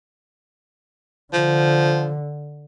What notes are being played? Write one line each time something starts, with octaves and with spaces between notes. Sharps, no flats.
D3 F3